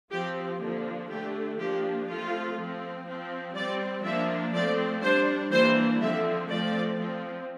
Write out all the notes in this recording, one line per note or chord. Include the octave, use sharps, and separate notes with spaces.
F3 C4 G4
D3 F3 A#3 D4
D3 A3 D4 G4
F3 A#3 D4 G4
F3 A3 C4 F4
F3 C4
F3 C4
G3 C4 D5
F3 A#3 D4 E5
F3 A3 C4 D5
G3 D4 C5
E3 G3 A#3 D4 C5
D3 F3 C4 E5
F3 A3 C4 D5
F3 C4